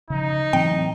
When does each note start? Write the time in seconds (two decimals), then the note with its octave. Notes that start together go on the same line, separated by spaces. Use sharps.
0.10 C#3 F3 D#4
0.53 A2 E3 F#3 C4 G5